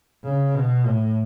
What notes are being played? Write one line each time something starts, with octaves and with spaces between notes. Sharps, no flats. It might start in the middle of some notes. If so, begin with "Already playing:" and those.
C#3
B2
A2